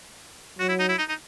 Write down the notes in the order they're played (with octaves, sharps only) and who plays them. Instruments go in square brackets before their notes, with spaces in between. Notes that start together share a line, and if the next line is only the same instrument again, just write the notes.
[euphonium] F#3 [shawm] F#4
[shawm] E4
D#4
E4
D#4
D#4